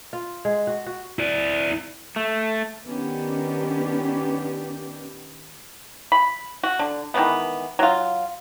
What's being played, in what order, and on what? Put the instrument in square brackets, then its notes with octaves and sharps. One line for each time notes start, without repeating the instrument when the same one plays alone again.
[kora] F4
G#3
F#4
F#4
[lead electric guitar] E4 D5
[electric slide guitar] A3
[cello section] D#3 B3 C#4 D4 G4
[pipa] B5
F#4
D3
D#3 E3 G#3 B3
F#3 F4